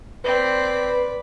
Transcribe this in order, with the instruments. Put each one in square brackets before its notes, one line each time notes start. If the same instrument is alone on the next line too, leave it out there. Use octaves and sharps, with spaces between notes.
[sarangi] C4 [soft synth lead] B4 [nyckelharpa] D5 B5